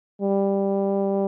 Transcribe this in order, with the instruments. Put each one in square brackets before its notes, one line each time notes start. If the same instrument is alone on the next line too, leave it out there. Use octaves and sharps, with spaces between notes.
[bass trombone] G3